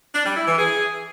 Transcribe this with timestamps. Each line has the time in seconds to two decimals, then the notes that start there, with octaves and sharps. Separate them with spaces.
0.15 D4
0.26 G3
0.37 E4
0.48 E3
0.58 G#4